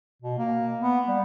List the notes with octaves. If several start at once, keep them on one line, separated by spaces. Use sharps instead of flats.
B2
A#3
B3
G3